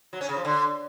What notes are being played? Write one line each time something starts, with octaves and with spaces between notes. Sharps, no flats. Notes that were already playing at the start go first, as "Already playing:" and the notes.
F#3
C#4
C#3
F3
D3